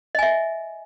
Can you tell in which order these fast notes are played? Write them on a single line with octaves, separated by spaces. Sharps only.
D#5 G#5 E5